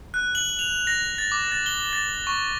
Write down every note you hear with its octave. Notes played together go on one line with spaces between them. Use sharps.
F#6
F#7
F7
A#6
A6
D6
A6
G7
A6
C#6